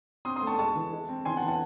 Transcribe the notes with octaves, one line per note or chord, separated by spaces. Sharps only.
C4 C6 D#6
C6 D#6
A3
A5 C#6
G#3 A5 C#6
E3
G#3
C4
E3 G#5 C6
F#5 A5
E3
F#5 A5